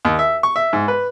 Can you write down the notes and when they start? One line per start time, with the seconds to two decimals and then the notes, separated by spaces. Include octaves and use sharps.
0.05 D#2
0.19 E5
0.43 C#6
0.56 E5
0.73 G#2
0.88 B4